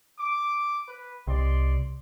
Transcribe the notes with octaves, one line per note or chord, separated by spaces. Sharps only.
D6
B4
C2 D5 D#5 C6